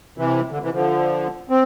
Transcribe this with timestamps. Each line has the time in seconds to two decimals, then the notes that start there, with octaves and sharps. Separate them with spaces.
0.18 C3 E3
0.51 D3
0.62 C3 E3
0.74 D3 F3
1.50 C4